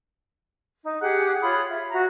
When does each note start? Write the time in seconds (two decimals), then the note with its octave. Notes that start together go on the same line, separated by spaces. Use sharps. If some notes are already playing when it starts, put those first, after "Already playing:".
0.83 D#4
1.01 G4 G#4 F#5 F#6
1.41 F4 C#5 B5 D#6
1.70 E5
1.91 F#4 E5 A#5